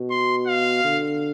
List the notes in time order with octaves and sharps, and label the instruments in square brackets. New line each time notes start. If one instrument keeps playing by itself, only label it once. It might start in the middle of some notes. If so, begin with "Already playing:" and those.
Already playing: [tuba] B2
[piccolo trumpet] C6
F5
[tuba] D3